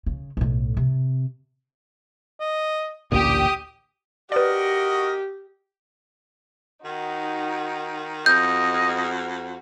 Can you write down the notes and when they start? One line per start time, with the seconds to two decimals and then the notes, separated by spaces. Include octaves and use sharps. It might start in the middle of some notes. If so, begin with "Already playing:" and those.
0.06 C#3
0.37 B1 A2
0.77 C3
2.40 D#5
3.12 A1 D2 A#2 G4 D#6
4.32 F#4 G4 A#4 B4 D5 D#5
6.84 D#3 D#4 F#4
8.26 F2 F#4 D#5 G6